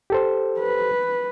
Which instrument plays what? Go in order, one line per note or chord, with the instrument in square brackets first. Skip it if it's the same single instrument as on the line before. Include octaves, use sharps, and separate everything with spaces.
[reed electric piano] G4 A4 C5
[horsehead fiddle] B4